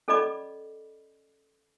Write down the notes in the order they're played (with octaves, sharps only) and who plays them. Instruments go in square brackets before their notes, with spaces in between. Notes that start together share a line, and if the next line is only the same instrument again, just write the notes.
[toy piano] C#4 A4 D5 D#5 B5 D6